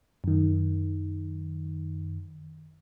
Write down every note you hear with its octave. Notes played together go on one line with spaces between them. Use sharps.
F#2 D#3